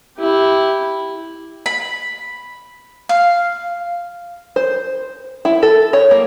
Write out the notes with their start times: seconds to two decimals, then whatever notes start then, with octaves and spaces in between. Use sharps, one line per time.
0.18 E4 G4
1.66 B5
3.09 F5
4.56 C5
5.45 E4
5.63 A4
5.93 C#5
6.11 A#3